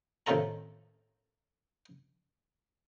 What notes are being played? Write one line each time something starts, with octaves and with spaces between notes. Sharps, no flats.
A2 C3 D#3 F4 A4 A#5